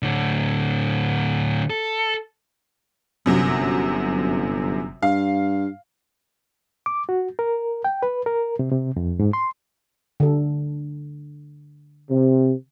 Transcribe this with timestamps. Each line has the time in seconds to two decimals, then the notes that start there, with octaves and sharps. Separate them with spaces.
0.03 A2 D3
1.70 A4
3.26 G1 F#2 C3 F#3
5.03 G2 F5
6.86 D6
7.09 F#4
7.39 A#4
7.84 G5
8.03 B4
8.26 A#4
8.59 C3
8.72 C3
8.96 F2
9.19 G#2
9.33 C6
10.20 D3 A4
12.10 C3